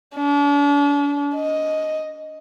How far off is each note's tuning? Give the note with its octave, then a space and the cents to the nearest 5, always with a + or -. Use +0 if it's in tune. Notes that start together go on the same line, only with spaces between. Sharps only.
D4 -40
D#5 +5